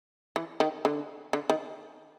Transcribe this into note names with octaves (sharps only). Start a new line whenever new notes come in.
E3
D#3
D3
D3
D#3